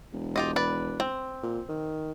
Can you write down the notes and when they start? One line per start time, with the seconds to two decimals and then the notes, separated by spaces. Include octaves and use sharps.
0.12 E1
0.36 F4 G4 D#5
0.56 B4 D5
1.00 C4
1.43 A#2
1.69 D#3